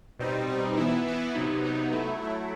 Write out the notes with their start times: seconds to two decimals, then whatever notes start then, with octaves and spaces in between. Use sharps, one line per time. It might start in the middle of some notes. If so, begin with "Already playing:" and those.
0.19 B2 G3 C4 D#4
0.48 B2 G3 C4 D#4
0.77 E3 B3 E4
1.06 E3 B3 E4
1.35 C3 F#3 B3 D#4
1.63 C3 F#3 B3 D#4
1.92 F#3 A3 E4
2.20 F#3 A3 E4